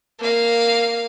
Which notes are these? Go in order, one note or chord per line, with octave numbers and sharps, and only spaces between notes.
A#3 F5